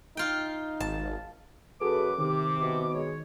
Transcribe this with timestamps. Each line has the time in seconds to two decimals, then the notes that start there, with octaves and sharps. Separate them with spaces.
0.17 D#4 F4 G5
0.80 G#1 A5
1.81 F#2 F#4 G#4 A4 B4 D6
2.18 C3 D#3 G4
2.59 B2
2.94 G#3 C#5